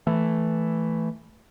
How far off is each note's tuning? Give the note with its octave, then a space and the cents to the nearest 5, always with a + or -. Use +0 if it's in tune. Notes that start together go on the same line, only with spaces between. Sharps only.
E3 +0 A3 +0